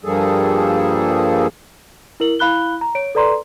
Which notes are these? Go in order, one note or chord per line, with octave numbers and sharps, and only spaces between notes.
G2 F3 G3 A#3 G#4 A4
E4 A#4 F#7
E4 F5 B5 F#6 G7
A#5
C#5 D7
A4 B4 D5 A#5 C6